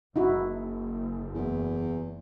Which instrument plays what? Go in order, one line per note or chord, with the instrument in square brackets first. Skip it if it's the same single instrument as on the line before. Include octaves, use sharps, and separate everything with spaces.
[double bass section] F#1 [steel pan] D#4 E4 F#4
[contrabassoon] E2